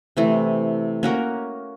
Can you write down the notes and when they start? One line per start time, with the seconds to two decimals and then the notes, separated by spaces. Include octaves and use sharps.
0.17 C3 E3 A3
1.03 A#3 C#4 F#4 A#4